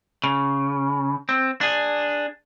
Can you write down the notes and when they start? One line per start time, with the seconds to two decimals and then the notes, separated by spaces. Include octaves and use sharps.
0.24 C#3
1.29 C4
1.61 D4 G#4